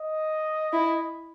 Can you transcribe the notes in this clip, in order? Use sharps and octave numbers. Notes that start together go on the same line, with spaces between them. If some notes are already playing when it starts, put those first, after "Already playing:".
Already playing: D#5
E4